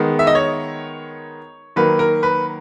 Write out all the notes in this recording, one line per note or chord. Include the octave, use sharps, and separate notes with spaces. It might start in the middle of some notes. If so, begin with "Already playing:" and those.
Already playing: D#3 G#3 B3
E5
D#5
C#5
D#3 F#3 A#3 B4
A#4
B4